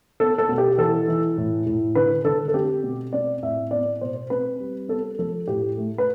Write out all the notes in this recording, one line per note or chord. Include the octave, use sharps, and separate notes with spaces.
B3 A4
A4
B2
G4
E3 A4
E3
A2
A2
D3 B4
D3 A4
A4
C4 G4
B2
C4 D5
A2 E5
B3 D5
B2 C5
C4 B4
G3
B3 A4
F3 A4
A2 G4
A3
B4